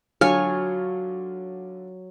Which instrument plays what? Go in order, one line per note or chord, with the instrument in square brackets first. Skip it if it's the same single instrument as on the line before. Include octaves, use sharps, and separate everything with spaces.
[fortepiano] D3 F4 F6 [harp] F#3 [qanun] C#5 G#5 C#6